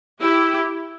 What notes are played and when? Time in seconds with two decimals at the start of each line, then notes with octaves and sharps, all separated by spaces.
0.21 E4 G4